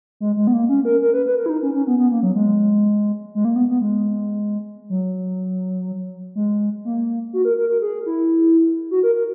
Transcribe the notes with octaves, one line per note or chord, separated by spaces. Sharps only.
G#3
G#3
B3
A#3
C#4
A#4
A#4
B4
B4
A#4
E4
D#4
C#4
C#4
B3
B3
A#3
F#3
G#3
G#3
A#3
B3
B3
G#3
F#3
G#3
A#3
F#4
A#4
A#4
A#4
G#4
E4
F#4
A#4
A#4